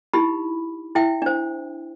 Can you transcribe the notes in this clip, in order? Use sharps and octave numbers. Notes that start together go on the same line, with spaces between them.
D#4 E4 G4 B5
E4 E5 G5
D4 C5